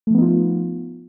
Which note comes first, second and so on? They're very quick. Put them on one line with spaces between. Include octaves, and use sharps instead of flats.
A3 F3 B3 D#4 F4